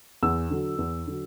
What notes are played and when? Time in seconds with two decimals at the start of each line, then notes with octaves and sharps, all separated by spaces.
0.22 E2 E6
0.51 D3 F#3
0.79 E2
1.07 D3 F#3